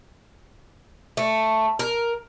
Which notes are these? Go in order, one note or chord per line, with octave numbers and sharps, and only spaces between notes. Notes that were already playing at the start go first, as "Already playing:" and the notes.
A3
A#4